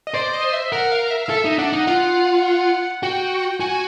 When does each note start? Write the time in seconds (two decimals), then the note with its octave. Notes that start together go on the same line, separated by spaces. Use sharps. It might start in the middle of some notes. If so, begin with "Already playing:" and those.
0.07 D#5
0.14 C5 D5
0.33 D#5
0.53 E5
0.72 A#4 F#5
0.92 F5
1.10 E5
1.26 F5
1.30 A4 E5
1.45 D#4
1.58 D4 F#5
1.73 D#4
1.87 F4 F#5
3.03 F#4 G5
3.60 F#4 G#5